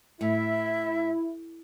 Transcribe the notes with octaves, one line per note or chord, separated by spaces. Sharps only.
A2 E4 E5